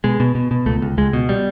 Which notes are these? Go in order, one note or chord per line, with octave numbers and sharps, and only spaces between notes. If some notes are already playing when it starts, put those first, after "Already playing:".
B2 G#3
B2
B2
B2
C#2 A3
C#2
C#2 G#3
B2
G3